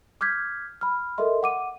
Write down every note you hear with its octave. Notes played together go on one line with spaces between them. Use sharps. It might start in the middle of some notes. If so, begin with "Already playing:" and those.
D6 F6 G6 G#6 B6
B5 F6
A4 A#4 D#5 E5 C6
F#5 D6 D#7